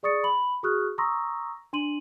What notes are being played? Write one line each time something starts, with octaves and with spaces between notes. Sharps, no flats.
G#4 D5 C#6 D#6 A6 C#7
B5 F#7
F#4 G#4 C#6 D#6 F6 F#6
A#5 C6 C#6 D#6 E6 A#6
D4 C6 D#7 F#7